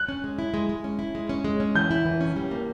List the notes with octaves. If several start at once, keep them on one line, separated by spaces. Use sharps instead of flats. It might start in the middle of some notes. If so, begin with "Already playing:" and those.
Already playing: F#6
C#4
G#3
E4
G#3
G#3
C#4
E4
G#3
C#4
G#3
C#4
E3 G6
E4
E3
C#4
G3
A#3